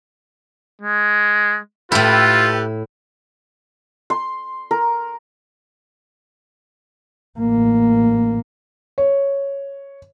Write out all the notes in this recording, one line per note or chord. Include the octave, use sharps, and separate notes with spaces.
G#3
A2 E4 F4 G4 A4 B4
C6
A#4
A1 A#3
C#5